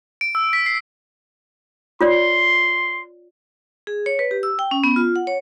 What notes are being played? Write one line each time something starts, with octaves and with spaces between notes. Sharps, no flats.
D7
E6
B6
C7
F4 C#5 D5 C6
G#4
C#5
B4
G4
E6
G5
C#4
B3
F4
F#5
C#5